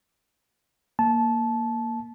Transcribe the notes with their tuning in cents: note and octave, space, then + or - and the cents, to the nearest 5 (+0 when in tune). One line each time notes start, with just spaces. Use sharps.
A#3 +0 A5 -15